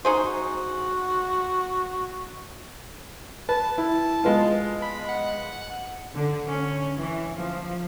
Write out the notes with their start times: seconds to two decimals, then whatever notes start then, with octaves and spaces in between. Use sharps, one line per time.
0.05 D#4 F#4 G#4 C5
3.49 B4 A5
3.78 E4
4.24 G#3 B3 F4
4.82 B5
5.09 F#5
6.12 D3
6.49 C#4
6.96 E3
7.33 F3